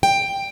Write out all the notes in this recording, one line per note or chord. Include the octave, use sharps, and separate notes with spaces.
G5